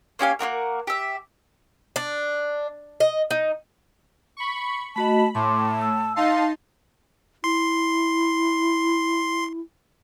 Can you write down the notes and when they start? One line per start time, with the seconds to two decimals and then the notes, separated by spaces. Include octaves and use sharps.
0.19 A#3 C#4 G4 F5
0.39 A#3 D4 F#4 A#4
0.87 G4 E5
1.96 D4
3.00 D#5
3.31 D#4
4.37 B5 C#6
4.96 A3 F#4 D#5 A5 B5
5.35 A2 A5 C6 D6
5.81 E6
6.16 D#4 F5 A5 C6
7.44 E4 C6